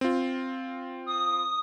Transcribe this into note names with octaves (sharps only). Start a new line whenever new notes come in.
C4 F4
D#6